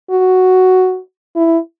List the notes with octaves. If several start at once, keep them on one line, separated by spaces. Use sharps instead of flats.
F#4
E4